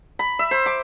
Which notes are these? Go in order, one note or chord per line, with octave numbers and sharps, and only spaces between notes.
B5
E5
C5
D6